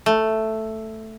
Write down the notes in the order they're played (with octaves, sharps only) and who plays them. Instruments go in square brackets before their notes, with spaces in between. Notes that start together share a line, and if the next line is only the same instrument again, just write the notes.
[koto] A3